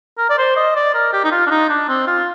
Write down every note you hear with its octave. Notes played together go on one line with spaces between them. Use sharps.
A#4
D5
C5
D#5
D5
A#4
G4
D#4
F4
D4
D#4
D4
C4
F4